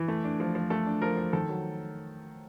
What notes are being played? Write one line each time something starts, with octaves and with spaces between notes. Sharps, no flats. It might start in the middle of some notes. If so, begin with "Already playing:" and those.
Already playing: E3
A3
D4
F3
F3
A3 A4
D4
F3 A#4
F3
D#3 A4
F#3